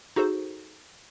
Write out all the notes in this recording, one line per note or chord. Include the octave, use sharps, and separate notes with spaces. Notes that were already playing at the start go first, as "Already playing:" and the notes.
D#4 F#4 G#4 A4 C5